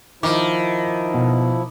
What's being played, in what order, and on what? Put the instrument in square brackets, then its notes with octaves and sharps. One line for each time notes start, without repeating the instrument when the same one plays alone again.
[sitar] D#3 [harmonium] F3 E4 [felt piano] D6
[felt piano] B2